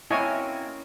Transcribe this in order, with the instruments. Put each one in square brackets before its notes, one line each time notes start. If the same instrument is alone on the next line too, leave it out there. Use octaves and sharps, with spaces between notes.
[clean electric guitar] A#3 C4 F#4 [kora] C#4 [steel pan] E4 D#5 G#5